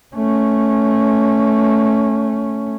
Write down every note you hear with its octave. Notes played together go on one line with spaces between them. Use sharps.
A3 C#4